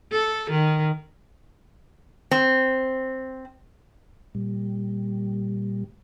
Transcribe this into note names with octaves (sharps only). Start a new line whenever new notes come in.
A4
D#3
C4
A#2 G3